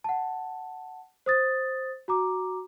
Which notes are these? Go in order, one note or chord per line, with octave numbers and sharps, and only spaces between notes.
F#5 A5
C5 D#6 A6
F#4 A#5 D6